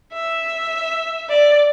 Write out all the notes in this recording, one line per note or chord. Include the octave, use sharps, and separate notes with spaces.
E5
D5